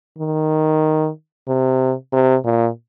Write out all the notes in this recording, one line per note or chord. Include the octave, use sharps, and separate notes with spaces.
D#3
C3
C3
A#2